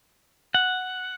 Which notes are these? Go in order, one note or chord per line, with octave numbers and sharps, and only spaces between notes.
F#5